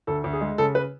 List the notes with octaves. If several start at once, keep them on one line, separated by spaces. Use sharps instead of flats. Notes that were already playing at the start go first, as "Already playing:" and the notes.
D2 A4
D2
G#4
G#3
C#3 A4
B4